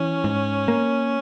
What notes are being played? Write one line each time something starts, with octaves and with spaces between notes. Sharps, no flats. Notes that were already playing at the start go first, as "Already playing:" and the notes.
Already playing: E3 C#4
G#2
A#3